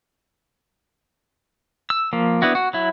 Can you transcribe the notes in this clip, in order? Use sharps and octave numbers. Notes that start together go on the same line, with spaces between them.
E6
F3 A#3
B3 D4 E4 F#4
F#4
F#3 E4